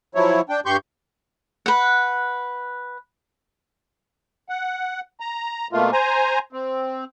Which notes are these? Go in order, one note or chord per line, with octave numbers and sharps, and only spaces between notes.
F3 F#3 E4 C#5
D4 G5
G2 G4 C6 C#6 G6
B4 F#5
F#5
A#5
B2 A3 A#3 F4
C5 G#5 A#5
C4